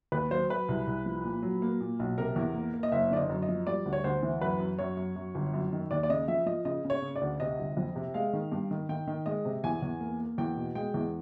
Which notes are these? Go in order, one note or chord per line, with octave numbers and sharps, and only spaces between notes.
D#2 B4
F#3 C5
F#3 B4
C2
C2
F3
A#2
F#3
A#3
A#2
B1
C3 A#4
E2
A#3
A#3
D#5
F#1 E5
D3 D5
D#5
F#2
D#5
F3
G3 D5
D2
C#5
D2 C5
E3
F#2 B4
F#2
F#2 C#5
F#2
F#2
G1
F#2
D#3
D#2 D5
D5
C#3 D#5
F3 E5
F3 D#5
C#3 D#5
C#3
C#5
C#3
D5
D2
C3 D#5
G1
F2
C3
G#3 F5
D#3
G2
D#3
D#3 G5
D#3
G#3 D#5
C3
E2 G#5
E2
A#3
A#3
E2 G5
B2
G#3 G5
E2